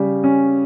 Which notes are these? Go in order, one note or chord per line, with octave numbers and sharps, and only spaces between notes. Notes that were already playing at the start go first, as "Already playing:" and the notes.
Already playing: C#3 G3
C#4